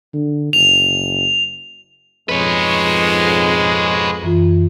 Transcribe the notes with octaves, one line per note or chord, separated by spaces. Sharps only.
D3
F#1 F7
F2 G#2 G#3 B4 C#5
F#2 E3 F4